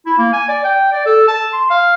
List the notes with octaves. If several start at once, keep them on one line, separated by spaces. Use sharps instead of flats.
E4
A#3
G#5
D5
G5
D5
A4
A5
C6
F5